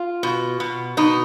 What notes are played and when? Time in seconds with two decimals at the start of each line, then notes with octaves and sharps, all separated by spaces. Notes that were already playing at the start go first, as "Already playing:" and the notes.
Already playing: F4
0.23 B2
0.60 B2
0.97 B2 D#4